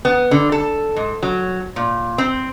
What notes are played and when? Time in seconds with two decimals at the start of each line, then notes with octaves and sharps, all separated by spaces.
0.05 B3
0.31 D3
0.52 A4
0.96 G#2
1.23 F#3
1.76 A#2
2.18 C4